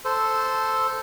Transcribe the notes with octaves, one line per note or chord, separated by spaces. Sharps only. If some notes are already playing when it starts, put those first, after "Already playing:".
A4 C5